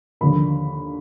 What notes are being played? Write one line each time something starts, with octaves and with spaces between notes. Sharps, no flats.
D#2 D3 F3 A#3 B5